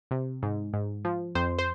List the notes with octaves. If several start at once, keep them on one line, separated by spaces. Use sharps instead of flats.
C3
G#2
G#2
F3
F2 C5
C5